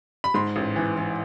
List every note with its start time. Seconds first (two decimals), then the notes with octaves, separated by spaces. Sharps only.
0.24 B5
0.34 G#2 C6
0.56 A1
0.76 E3
0.97 E3